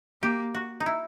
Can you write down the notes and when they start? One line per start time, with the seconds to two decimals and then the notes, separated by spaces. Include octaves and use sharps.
0.22 A#3 G4
0.54 F#4
0.80 D#4
0.86 E4